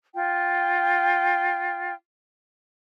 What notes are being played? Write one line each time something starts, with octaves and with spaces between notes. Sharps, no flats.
F4 G5